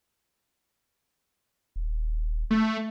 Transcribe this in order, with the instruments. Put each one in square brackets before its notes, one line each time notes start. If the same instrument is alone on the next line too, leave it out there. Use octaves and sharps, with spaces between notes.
[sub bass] D#1
[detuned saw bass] A3